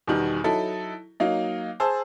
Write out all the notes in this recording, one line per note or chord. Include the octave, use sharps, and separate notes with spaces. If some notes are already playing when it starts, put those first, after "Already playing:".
E2 B2 D#3 G3
F#3 D#4 E4 A4
F#3 A#3 D#4
G#4 C5 A5 E6